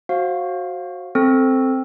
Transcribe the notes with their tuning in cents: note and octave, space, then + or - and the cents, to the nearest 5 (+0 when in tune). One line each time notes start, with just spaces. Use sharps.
F#4 -5 C5 +35 F5 +0
C4 +0 A4 +0